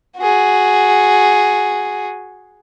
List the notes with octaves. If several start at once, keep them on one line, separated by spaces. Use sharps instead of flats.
F#4 G#4